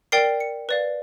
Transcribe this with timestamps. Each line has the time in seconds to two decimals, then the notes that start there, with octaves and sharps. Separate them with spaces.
0.12 A#4 D5 G5 C7
0.40 C#7
0.69 B4 D5 F5